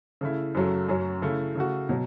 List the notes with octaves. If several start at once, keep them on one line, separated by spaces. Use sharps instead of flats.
C#3 A3 E4
F#2 C#3 F#3 A3
F#2 F#3 C#4
C#3 A3 E4
C#3 A3 F#4
B2 F#3